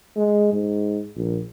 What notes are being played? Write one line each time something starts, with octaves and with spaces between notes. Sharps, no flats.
G#3
G#2
A#1